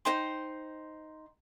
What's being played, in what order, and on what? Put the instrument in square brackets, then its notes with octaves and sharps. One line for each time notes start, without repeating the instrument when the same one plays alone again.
[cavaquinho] D#4 C5 G5 C6